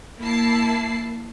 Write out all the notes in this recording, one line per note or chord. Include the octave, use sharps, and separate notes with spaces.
A#3 E4 A5 C7